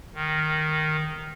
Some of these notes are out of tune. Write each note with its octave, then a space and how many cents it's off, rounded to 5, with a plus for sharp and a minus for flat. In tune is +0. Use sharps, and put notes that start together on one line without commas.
D#3 -5